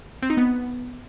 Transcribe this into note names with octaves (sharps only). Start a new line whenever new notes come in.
C4
D#4
B3